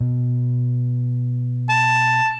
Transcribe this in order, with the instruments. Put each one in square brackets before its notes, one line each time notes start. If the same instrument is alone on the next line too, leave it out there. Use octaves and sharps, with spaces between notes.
[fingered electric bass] B2
[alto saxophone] A5